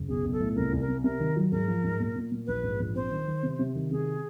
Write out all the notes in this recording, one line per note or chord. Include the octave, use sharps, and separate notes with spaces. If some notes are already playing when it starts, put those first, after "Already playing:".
Already playing: F#1
B1 G#4
B1
A4
A2
C2 A#4
C2
A#4
C3
C3 A#4
D#3
F#3
G#2 A#4
F3
G#2
A#2
A#2
A#2
A#1 B4
G#2
A#1
C4 C5
D#3
D#3
C3
C3
D#3
C3 G#4